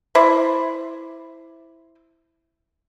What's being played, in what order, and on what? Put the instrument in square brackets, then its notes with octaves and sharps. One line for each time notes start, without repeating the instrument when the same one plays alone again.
[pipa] E4 C5 D5